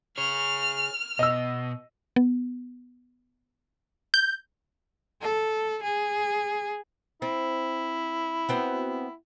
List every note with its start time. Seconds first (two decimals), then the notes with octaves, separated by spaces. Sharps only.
0.18 G#4 C#5 F6
1.19 B2 D#5 E6
2.16 B3
4.14 G6
5.22 A4
5.82 G#4
7.22 C4 E4
8.49 B3 C4 F#4